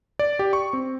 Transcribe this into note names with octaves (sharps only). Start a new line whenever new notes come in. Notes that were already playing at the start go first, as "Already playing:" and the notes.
D5
G4
C#6
C4